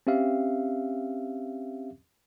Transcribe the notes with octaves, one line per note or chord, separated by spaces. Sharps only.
C4 C#4 G4 E5 F5